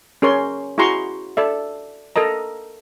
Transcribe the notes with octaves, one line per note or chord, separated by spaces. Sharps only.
C#4 G#4 A#4 C#5 C6
E4 F#4 G#4 A#5 C6 C#6
A4 D5 E5
A4 A#4 D#5 A#5